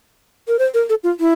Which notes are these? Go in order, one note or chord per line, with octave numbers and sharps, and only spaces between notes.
A#4
C5
A#4
A4
F4
E4